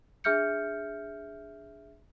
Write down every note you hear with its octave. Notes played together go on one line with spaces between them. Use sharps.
D4 G#4 E5 F6 G6 C#7